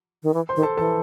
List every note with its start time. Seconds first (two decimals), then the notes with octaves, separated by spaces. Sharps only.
0.23 D#3
0.34 E3
0.49 C5 C6
0.56 D#3
0.62 A4 A5
0.77 E3 A4 A5